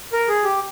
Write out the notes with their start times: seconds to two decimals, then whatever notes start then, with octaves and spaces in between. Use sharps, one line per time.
0.13 A#4
0.28 G#4
0.44 G4